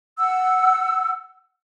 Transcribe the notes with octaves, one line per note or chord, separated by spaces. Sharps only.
F#5 E6